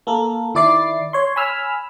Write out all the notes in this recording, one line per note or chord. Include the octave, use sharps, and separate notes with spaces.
A#3 A4 A#4
D#3 E4 D5 D6 C7
C#5 C6
G#5 B5 E6 F6